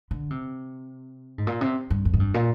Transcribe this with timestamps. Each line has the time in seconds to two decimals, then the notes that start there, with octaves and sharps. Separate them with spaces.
0.11 D3
0.30 C3
1.38 G#2
1.47 A#2
1.61 C3
1.90 G2
2.05 F2
2.14 G#2
2.20 G2
2.34 A#2